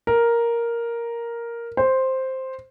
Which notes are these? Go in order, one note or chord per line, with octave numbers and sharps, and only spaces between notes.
A#4
C5